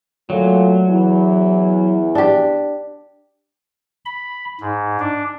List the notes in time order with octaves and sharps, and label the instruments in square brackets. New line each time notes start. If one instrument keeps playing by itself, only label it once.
[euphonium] A#2 [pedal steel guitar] F#3 [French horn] A3
[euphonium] E2 [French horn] E3
[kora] D4 G4
[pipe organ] B5
G#2
D4